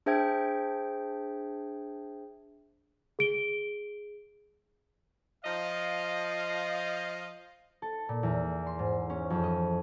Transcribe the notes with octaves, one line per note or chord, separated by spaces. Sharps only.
D4 G#4 C5 E5 G5 G#6
G#4 D7 G7
F3 D#5 F5
A4
A#2
E2
C6
G#2
C#4
F2
D#5